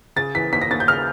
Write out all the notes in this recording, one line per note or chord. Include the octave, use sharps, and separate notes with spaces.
C#3 A6
E3 B6
D#2 B6
A#6
D#2 A6
G6
C#3 F6